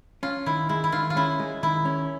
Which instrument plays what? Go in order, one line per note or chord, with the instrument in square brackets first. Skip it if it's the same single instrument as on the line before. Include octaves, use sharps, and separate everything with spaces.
[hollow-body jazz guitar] C#4 [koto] F4
[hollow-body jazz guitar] D#3 [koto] E4
[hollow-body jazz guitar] G#3 [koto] E4
[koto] E4
[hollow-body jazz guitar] D#3 [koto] F4
[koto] F4
[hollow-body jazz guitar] C#4 [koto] E4
[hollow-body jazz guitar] G#3
[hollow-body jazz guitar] D#3 [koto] E4
[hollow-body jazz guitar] C#4